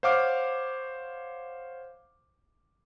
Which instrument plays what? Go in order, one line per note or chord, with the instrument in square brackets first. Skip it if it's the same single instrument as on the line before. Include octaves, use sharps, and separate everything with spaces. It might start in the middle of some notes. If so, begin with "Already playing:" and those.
[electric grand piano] C5 C#5 F5 F#5 D6 F6